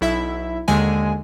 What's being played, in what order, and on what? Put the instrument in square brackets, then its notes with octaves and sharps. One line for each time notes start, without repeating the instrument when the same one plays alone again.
[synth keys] B1 E4 E5
D#2 D3 G#3 G#5